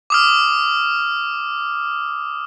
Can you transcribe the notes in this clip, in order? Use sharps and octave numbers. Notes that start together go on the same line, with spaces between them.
D6 D#6 F6